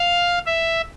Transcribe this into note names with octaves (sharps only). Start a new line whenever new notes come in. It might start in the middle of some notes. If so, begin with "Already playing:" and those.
Already playing: F5
E5